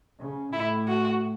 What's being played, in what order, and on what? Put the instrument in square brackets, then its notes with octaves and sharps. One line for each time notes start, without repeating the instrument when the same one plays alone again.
[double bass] C#3
[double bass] A2 [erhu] E4
[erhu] F#4